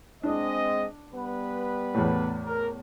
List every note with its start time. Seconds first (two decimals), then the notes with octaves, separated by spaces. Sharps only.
0.23 G#3 C4 D4 D#5
1.13 G3 B3 B4
1.94 E2 A2
2.45 A#4